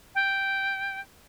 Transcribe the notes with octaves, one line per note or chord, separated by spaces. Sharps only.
G5